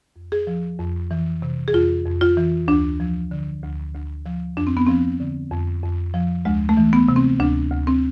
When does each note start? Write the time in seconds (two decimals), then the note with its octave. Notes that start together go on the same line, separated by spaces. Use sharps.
0.16 F2
0.32 G#4
0.47 F3
0.79 F2
1.11 E3
1.42 C3
1.68 G#4
1.74 F2 F4
2.05 F2
2.21 F4
2.37 E3
2.68 D2 D4
3.00 F3
3.31 D3
3.63 D2
3.94 D2
4.26 F3
4.57 F2 D4
4.67 C4
4.77 B3
4.86 F3 C4
5.20 D3
5.51 F2
5.83 F2
6.14 F3
6.45 D2 G#3
6.69 A3
6.77 E3
6.93 B3
7.09 C3
7.16 C4
7.40 D2 D4
7.72 D2
7.87 C4